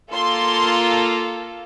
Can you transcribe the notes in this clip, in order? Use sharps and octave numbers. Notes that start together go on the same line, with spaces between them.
A#3 F4 A4 C6